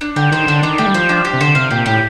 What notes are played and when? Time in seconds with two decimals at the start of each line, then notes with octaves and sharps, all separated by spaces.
0.01 D4
0.16 D3 G4
0.32 D#3 C5
0.47 D3 D4
0.63 D#3 D4
0.78 A3 G4
0.86 G3
0.94 F3 C5
1.09 D4
1.25 G4
1.34 C3
1.41 D3 C5
1.55 C3 F5
1.71 A#2 G4
1.86 A2 G4